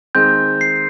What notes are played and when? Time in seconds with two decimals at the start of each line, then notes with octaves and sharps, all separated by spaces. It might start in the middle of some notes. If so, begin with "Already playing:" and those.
0.15 D#3 G#3 C4 G6
0.61 C7